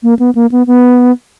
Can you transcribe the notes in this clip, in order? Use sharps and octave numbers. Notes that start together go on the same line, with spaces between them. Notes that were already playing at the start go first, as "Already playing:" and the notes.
A#3
B3
A#3
B3
B3